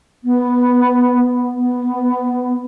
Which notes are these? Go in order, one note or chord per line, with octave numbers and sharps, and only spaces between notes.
B3
B3